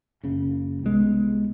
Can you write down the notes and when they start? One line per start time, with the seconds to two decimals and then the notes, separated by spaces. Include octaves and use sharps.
0.23 F#1 F#2 C#3
0.83 C2 B2 G#3 B3